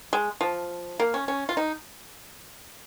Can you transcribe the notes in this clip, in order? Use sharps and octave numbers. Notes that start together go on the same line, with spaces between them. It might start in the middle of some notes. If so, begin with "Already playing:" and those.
G#3
F3
A#3
C#4
C#4
F4
D#4